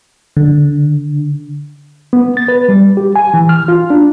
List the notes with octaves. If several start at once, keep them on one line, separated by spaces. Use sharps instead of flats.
D3
B3
A6
B4
G3
G4
G#5
E3
F6
F4
D4